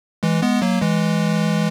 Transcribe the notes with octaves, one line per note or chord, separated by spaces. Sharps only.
E3 G#3
G#3 B3
F#3 A#3
E3 G#3